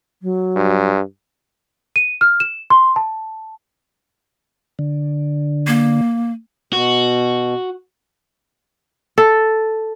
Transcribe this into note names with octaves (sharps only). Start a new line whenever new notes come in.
F#3
G2
D#7
F6
E7
C6
A5
D3
A#3
B2 F#4
A4